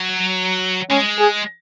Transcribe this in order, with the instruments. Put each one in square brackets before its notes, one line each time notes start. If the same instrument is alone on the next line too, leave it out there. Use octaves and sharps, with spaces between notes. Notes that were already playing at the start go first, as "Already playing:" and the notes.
Already playing: [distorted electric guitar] F#3
[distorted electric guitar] G#3 [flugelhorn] C#4
[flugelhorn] G#4